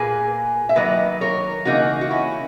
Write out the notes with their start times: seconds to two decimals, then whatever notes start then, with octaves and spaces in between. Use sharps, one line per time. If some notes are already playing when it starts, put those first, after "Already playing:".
Already playing: A#2 A#3 G#4 B4
0.69 E5
0.75 D#3 F#3 A#3 B4 D#5
1.21 A#4 C#5
1.65 C#3 E3 A#3 D#4 F#4
2.01 F#4
2.10 C#4 E4